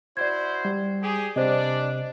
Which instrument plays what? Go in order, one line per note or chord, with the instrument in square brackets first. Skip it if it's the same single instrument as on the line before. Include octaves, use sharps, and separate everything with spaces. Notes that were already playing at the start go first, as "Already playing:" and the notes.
[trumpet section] E4 F#4 C5 [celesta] D5 G#6
[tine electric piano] G3
[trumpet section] G4 G#4
[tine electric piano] C3 [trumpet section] G3 D4 D5 [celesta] C5 D#5